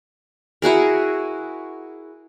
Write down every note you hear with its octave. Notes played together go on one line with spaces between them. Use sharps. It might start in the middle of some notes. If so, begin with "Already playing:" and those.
E4 F#4 G#4 A#4